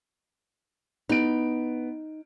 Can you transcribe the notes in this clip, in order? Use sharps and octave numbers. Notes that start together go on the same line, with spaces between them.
B3 D#4 D7